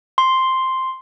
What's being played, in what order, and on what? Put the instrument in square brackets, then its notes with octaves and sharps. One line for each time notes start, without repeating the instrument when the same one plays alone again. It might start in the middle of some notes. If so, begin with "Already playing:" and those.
[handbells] C6